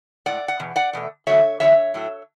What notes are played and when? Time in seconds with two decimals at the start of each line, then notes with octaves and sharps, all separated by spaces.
0.26 A2 G#3 D5 F#5
0.48 F#5
0.60 E2 B2
0.76 D5 F#5
0.93 E2 B2 A3
1.27 E2 D3 F#3 A3 C#5 E5
1.60 E2 D3 F#3 A3 C#5 E5
1.94 A2 F#3 A3